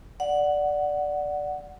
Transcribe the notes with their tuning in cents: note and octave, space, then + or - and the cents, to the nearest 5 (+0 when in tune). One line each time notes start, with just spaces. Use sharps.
D5 +0 F#5 +0